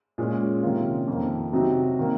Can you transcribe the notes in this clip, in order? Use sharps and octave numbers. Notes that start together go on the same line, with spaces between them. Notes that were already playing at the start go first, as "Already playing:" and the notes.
A#2 G#3 C#4
C3 D#3 A#3 C#4 F4
F2 D#3 A#3
C3 F#3 C4 D#4 F#4
D#3 A#3